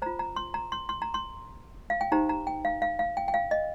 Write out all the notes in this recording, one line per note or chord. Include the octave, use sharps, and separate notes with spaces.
F4 C5 A#5
A#5
C6
A#5
C6
C6
A#5
C6
F5
G5
D#4 G4 C5 A#5
A#5
G5
F5
F5
F5
G5
G5
F5
D#5